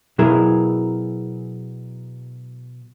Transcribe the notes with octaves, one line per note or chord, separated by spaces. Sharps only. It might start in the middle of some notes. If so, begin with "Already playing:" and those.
B2 F#3 E4 G#4 A#4